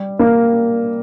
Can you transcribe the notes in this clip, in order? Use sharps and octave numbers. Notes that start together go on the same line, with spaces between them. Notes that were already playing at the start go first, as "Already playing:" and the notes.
Already playing: G3
A#3